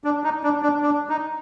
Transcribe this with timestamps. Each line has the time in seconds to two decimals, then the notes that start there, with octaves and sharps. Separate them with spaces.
0.04 D4
0.24 D#4
0.43 D4
0.62 D4
0.82 D4
1.09 D#4